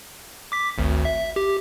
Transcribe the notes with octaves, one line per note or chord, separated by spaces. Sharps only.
D6 B6
G#1 D2
E5
G4